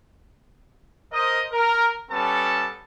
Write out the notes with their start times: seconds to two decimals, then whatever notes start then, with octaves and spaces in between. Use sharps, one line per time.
1.11 A#4 C5 D#5
1.50 A#4
2.09 G3 B3 C#4 A4 A5